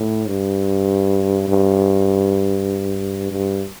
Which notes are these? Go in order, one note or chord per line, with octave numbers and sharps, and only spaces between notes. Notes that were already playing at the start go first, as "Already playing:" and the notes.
Already playing: A2
G2
G2
G2